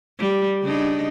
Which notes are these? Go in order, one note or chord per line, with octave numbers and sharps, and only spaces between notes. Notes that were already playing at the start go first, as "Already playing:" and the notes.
G3
C#3 D4 D#4